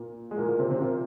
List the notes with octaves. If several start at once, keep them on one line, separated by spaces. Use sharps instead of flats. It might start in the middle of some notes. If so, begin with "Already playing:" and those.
Already playing: A#2 A#3
G#3
A#2 A#3
A#2 A#3
C3 C4
C3 C4
A#2 A#3